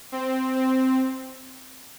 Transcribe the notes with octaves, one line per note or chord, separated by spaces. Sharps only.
C4
C4